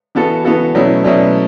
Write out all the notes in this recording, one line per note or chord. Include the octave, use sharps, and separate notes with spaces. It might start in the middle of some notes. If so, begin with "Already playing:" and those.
E3 B3 F#4 A4
E3 B3 F#4 A4
B2 F#3 A3 C#4 E4
B2 F#3 A3 C#4 E4